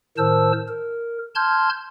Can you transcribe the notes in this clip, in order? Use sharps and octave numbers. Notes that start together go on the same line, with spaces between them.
A2 D#3 A#4 C5 A5 E6
A#4
A5 C6 F6 G6 G#6